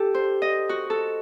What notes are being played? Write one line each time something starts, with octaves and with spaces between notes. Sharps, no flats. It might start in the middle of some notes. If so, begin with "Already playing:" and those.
Already playing: G4 A4
C5
D#5
F#4
A4